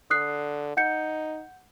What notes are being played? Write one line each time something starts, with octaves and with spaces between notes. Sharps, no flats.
D3 D#6 F#6 C7
D#4 F#5 G6 C#7